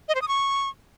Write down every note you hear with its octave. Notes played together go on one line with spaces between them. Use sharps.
D#5
C5
D#6
C#6